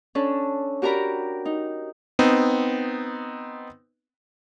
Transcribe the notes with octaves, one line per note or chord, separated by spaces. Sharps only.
C#4 D4 A4
F#4 G4 A#4 D5 A#5 B5
D#4
B3 C4 D#4